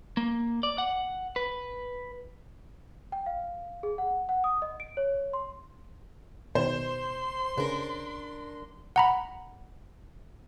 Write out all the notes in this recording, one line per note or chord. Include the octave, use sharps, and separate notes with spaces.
A#3
D5
F#5
B4
G5
F5
G#4
F#5
F#5
D#6
D#5
D7
C#5
C6
B2 D#3 C5 C6
C#3 D4 A#4 B4
F#5 A#5 B5